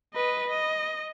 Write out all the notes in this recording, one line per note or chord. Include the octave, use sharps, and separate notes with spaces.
B4 D#5
D#5